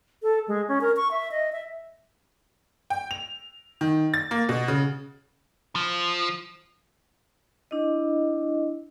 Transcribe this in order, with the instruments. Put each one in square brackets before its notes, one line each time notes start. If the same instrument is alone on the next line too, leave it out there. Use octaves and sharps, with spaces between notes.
[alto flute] A4
G#3
C#4
A#4
C#6
E5
D#5
E5
[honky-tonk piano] G5
F7
D#3
A6
A#3
B2
C#3
[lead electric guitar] F3
[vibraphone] D4 E4 D#5